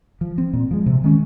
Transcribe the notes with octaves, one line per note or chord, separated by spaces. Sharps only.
F3
C4
A#2
F3 G#3
C3
D#3 G#3 C#4